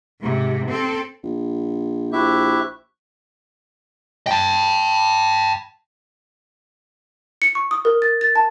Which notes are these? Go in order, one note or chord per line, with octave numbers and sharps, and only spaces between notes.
G#2 C3
C4 A4
A#1
A#1 E4 G4 C5 E5 C#6 F#6
G5 A5
C#7
C#6
D#6
A#4
A6
A6
A5